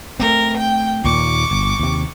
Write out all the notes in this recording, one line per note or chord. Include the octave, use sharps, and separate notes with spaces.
A3 C4 A#4
G5
D#2 A#2 C#6 D6
G1
D#2 C3